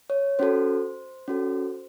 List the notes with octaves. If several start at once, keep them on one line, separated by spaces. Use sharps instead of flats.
C#5
C#4 F#4 A4 C5
C#4 F#4 A4